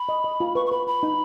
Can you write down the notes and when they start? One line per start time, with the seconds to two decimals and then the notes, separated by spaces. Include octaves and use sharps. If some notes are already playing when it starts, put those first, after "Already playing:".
Already playing: B5
0.09 D#5
0.24 D#5
0.40 F4
0.55 B4 C#6
0.66 C#6
0.71 B4 B5
0.87 B4 B5
1.03 D#4